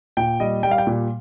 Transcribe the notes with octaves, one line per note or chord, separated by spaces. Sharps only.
A#2 G5
G3 D#5
G3 G5
F5
G5
A#2